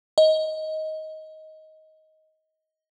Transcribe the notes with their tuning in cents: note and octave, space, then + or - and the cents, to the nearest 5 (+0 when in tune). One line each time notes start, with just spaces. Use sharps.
D#5 +15